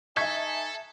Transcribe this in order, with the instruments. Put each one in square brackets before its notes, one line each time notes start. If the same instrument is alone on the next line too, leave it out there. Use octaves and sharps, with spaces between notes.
[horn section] D#4 G#5 [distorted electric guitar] A4 [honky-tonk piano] E5 A5 [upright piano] C#6 G#6 B6